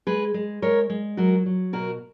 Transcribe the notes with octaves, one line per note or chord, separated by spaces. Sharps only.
G#3 G#4 B4
G#3
G#3 A#4 C#5
G#3
F#3 F#4 A#4
F#3
B2 F#4 A#4